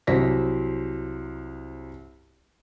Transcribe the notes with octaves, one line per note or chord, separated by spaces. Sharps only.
C2 F#3 C5 A#6 B6